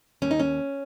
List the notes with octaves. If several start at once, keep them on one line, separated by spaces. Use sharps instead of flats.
D#2 C#4
D#4
C#4